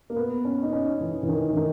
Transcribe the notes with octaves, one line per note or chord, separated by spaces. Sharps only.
A#3
B3
C#4
D#4
C#4
E3
E3
D#3
E3
D#3